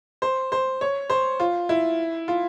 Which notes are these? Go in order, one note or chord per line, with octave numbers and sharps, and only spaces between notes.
C5
C5
C#5
C5
F4
E4
F4